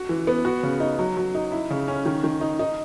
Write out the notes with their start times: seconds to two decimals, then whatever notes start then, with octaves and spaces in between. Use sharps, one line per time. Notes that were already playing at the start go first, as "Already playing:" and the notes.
Already playing: F#4
0.09 E3
0.27 B3
0.45 F#4
0.63 C#3
0.80 D#4
0.99 F#3
1.17 F#3
1.35 D#4
1.52 E4
1.70 C#3
1.88 C#4
2.05 D#3
2.24 D#3
2.41 D#4
2.59 D#4